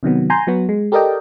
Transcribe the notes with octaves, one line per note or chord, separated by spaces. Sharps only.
C3 D#3 F#3 B3
G#5 A#5 C6 G6
F#3 B3 F#4
G#3
G4 A4 A#4 D5 D#5 G5